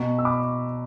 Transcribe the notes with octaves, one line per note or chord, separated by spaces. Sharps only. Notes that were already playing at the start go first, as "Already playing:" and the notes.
Already playing: B2 A#5 C#6
E6
B5 D6